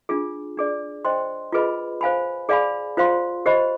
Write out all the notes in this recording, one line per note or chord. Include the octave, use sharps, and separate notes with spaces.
D4 F4 G#4
D4 G#4 D5
C5 D#5 G5 C6
F4 G#4 B4 D#5 B5
C5 F5 G#5 B5
G#4 D5 F5 G#5 B5
F4 C5 F5 C6
G4 C5 D#5 B5